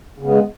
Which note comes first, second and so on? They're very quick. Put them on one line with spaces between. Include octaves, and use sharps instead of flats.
C#3 B3 G#3